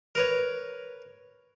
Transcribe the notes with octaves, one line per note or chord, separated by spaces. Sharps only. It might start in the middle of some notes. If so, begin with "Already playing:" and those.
A#4 B4 C#5